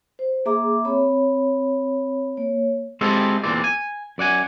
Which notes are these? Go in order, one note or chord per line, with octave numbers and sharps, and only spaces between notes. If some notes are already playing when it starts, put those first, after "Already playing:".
C5
A#3 G#4 E5 A#5 D6
C4 C#5 B5
A#3 C#5
G#3 C4 E4 F4 G4 A4
E2 A#2 D3 A#3 C4 D5
G#5
F#2 D5 F#5 G#5